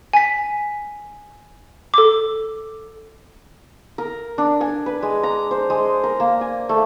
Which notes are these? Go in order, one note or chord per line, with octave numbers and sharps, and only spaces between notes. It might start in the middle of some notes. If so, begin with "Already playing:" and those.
G#5 B6
A4 D6
A#4
D4
G#5
B4
G#3
A#5
C5
G#3
A#4
A#3
G#5
A3